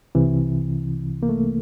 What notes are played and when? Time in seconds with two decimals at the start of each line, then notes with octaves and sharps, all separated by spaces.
0.15 C2 C3 E3
1.23 A#3
1.29 A3